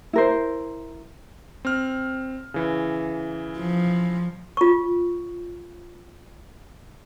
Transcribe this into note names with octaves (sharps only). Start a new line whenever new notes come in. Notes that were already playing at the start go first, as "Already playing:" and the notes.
E4 A#4 C5
C4 F6
C#3 E3
F3
F4 C#6